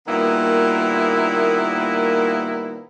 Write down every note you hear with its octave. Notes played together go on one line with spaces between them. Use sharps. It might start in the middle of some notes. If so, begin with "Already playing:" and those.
A#2 D#3 G3 A#3 B3 E4